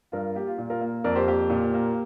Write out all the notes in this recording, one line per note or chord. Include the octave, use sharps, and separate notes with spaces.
G2 F4 A#4
A#3 G4
F4
A#2
F4 A#4
A#3
F2 A#4 D5
G4 C5
A#3 G4
A#2
A#3